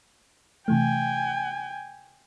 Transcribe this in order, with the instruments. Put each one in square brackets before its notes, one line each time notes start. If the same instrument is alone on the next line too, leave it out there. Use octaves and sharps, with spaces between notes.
[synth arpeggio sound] C3 E3 A3 [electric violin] G5 G#5